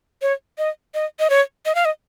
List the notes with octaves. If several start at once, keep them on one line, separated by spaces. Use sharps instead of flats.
C#5
D#5
D#5
D#5
C#5
D#5
F5
D#5